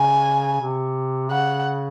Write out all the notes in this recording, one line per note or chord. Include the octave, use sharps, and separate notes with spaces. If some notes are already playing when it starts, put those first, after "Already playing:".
Already playing: C#3 G#5
C3
C#3 F#5